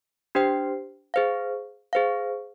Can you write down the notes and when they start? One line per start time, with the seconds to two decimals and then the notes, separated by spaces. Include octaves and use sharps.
0.35 D4 G4 C5 G5
1.14 G#4 C5 F5
1.93 G#4 C5 F5